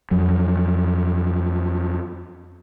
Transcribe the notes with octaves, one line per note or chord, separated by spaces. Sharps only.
F2 F#3